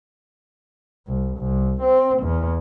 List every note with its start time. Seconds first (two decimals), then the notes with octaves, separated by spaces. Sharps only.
1.07 C2
1.38 C2
1.82 C4
2.22 E2